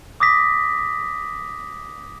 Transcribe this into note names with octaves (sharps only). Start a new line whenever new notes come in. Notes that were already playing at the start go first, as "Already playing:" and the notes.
D6 D#6 A#6 B6